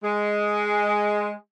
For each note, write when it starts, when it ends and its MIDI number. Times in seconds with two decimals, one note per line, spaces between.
0.04 1.32 56